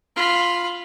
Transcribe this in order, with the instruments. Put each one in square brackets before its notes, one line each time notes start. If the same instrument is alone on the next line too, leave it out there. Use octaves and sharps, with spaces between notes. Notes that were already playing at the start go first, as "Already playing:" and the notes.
[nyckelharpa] F4 B5